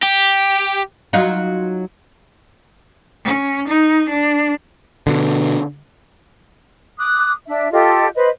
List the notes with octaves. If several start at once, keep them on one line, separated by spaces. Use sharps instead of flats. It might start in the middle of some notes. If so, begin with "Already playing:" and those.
G4
F#3 D#4 F4
C#4
D#4
D4
B2 D3
D6 D#6 F#6
D4 E5
F4 G4 A4 D#5
B4 C5 D#5